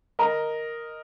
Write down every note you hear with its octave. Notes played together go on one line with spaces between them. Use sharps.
A#4 D#5 A#5